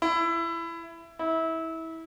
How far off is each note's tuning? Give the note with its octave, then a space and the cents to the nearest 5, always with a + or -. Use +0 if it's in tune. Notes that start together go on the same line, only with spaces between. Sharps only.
E4 +20
E4 -25